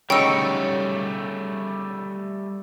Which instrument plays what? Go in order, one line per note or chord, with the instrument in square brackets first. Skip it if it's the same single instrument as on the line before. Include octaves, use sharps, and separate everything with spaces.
[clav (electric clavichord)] C#3 F#3 D#4 [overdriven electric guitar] G3 A3 [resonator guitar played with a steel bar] C#5 [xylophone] G5 E6